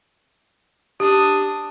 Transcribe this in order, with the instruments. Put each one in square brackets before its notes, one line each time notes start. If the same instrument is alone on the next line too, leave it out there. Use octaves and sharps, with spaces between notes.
[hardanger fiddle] D4 D#6 [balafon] G4